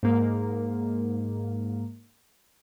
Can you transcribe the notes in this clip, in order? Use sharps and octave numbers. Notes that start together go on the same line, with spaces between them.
G#2 A#3